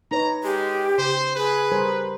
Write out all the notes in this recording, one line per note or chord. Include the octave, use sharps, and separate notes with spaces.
D#4 B4 C#5 A#5
G#3 G4
C#3 C5
G#4 B4
G3 A#4 C5